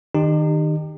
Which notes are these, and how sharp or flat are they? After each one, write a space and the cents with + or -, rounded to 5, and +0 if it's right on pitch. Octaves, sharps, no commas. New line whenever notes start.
D#3 +0 D#4 -35 G4 +20